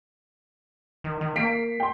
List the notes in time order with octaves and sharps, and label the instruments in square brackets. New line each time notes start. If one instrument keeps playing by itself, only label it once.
[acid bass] D#3
D#3
[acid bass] A#3 [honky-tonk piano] B6 C7 D7
[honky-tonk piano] G5 C6